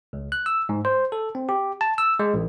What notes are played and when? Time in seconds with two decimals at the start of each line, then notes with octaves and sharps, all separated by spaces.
0.13 C#2
0.32 F#6
0.46 E6
0.69 G#2
0.85 C5
1.12 A4
1.35 C4
1.49 G4
1.81 A5
1.98 E6
2.19 G#3
2.34 A1